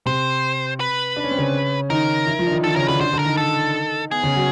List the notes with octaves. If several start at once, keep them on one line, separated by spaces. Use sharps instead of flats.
C3 C4 C5
B4
D4
C#4
C4
C#3 C#4
D#3 D#4 A#4
E3 E4
F3 F4
D4
D#3 D#4
D#3 D#4 A4
C#3 C#4 A#4
D3 D4 B4
D3 D4 C5
D3 D4
A#4
D#3 D#4
A4
B3 G#4
C#3 C#4
F#3 F#4